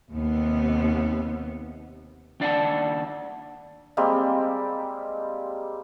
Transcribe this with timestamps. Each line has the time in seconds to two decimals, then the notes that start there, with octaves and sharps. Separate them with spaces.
0.11 D#2 C3 B3
2.40 D#2 D4 D5 F5 F#5 A5
3.97 G3 G#3 A#3 C4